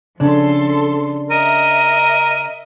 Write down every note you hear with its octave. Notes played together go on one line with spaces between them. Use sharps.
C#3 F3 D4 A4 C6
A#4 D#5 E5 D#7